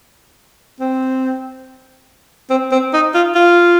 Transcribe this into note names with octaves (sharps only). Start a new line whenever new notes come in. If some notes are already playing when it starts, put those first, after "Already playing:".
C4
C4
C4
D#4
F4
F4